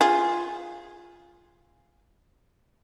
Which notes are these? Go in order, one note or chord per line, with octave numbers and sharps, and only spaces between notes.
F4 G#4